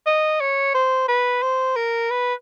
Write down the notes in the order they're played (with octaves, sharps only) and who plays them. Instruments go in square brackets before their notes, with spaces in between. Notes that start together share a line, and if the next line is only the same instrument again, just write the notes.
[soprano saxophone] D#5
C#5
C5
B4
C5
A#4
B4